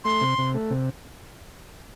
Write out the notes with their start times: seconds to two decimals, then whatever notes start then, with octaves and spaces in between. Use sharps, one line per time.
0.04 A3 C6
0.21 C3
0.38 C3
0.54 A3
0.71 C3